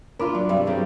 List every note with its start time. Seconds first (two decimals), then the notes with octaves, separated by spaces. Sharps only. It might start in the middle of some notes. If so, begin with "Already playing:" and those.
0.20 D4 F4 A#4 B5 D6
0.35 F#3 D5
0.49 G2 C3 G3
0.67 F#3 G3 C4 G#4